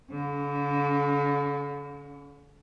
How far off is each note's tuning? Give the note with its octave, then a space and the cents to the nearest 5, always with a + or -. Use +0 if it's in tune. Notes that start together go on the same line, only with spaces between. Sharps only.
D3 -40 C#4 +25